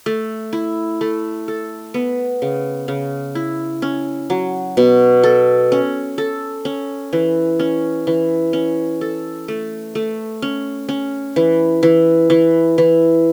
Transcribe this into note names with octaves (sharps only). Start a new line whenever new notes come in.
A3
E4
A3
A4
B3
C#3
C#3
E4
C#4
F#3
B2
A4
C#4
A4
C#4
E3
C#4
E3
C#4
A4
A3
A3
C#4
C#4
E3
E3
E3
E3